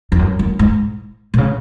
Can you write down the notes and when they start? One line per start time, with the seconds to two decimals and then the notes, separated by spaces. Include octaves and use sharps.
0.12 F2
0.19 F#2
0.39 F#2
0.59 G#2
1.34 B2
1.38 C#3